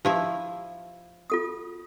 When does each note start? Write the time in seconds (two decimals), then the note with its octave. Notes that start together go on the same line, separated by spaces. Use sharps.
0.05 F3 E4 G4 E5
1.30 F4 A4 D#6